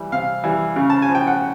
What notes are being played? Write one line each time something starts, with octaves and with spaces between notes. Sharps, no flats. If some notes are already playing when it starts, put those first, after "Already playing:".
Already playing: E3 G3
C3 F5
E3 G3
C#3
A5
G#5
F3
G5
F#5